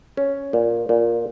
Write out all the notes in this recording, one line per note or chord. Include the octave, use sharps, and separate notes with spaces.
C#4
A#2
A#2